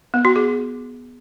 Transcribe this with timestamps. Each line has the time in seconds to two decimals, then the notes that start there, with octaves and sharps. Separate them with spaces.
0.14 B3
0.25 F#4
0.36 G#4